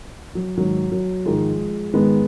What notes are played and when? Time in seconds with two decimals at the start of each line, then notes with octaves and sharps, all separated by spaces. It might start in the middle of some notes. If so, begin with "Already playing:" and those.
0.35 F#3
0.57 G#2 D#3 F#3
0.92 F#3
1.25 G#2 D#3 F3 G#3
1.94 G#2 D#3 G#3 B3